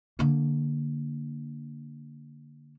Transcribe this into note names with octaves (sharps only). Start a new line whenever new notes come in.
D3 A#3